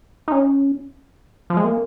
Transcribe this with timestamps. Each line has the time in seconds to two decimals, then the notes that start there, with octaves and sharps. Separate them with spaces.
0.28 D#4
0.32 C#4
1.50 F3
1.57 G#3
1.64 A#3